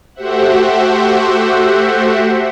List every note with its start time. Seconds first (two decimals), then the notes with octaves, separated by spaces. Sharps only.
0.15 A3 F#4 G4 C5 E5 F#5